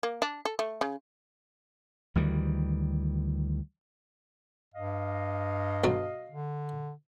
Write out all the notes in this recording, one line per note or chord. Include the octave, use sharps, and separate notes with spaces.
A#3
D4
A4
A3
C#3
D2 D#3 E3 G3
G2 D#5 F5
B1 F#3
D3